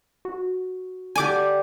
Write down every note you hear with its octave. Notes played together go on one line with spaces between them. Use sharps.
F#4
D3 G4 D5 F#5 G#5 D6 G#6